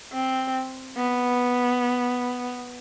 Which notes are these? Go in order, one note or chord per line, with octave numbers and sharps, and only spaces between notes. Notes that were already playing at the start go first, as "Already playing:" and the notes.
C4
B3